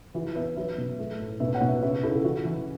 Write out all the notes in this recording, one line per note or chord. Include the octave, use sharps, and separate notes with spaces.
E3 F#4 B4
B3 B4 E5
F#3 B4 E5
B2
A3
A2
B2 B4 E5
C#5 F#5
B2
B4 E5
C#3 B4 E5
C#3 E4 A4
E3 F#4
E3